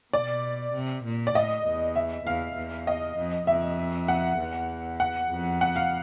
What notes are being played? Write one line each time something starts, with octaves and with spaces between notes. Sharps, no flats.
B2 D5
C3
A#2
D5
A2 D#5
E2
E5
E2 F5
E2
D#5
F2
F2 E5
F#5
E2
F#5
F2
F#5
F5